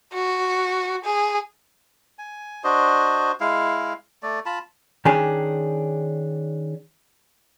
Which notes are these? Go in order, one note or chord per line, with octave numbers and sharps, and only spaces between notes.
F#4
G#4
G#5
D4 F#4 C5 D#5
G#3 E4 F5
A3 D5
F4 A5 B5
D#3 C#4 D4 G4 G#4